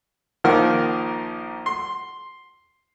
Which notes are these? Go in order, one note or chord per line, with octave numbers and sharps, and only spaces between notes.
A#1 D#3 F3 A#3 A#4 F6
C6